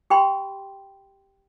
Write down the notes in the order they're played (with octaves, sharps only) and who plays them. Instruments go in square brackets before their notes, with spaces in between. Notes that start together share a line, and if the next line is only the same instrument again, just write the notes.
[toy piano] G4 G5 B5 C6